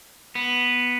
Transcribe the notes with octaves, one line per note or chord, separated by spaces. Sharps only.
B3